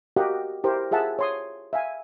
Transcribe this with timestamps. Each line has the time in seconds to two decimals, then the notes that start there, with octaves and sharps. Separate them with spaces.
0.16 F#4 G4 A#4 D#5 F5 F#5
0.64 E4 G4 A#4 C5
0.91 F4 G#4 E5 F#5 A5
1.19 C#5 C6 D#6
1.73 E5 F5 G#5